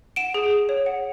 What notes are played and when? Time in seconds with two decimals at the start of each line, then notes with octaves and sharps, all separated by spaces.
0.16 F#5 D7 E7
0.34 G#4
0.51 G#4
0.69 C#5
0.86 F#5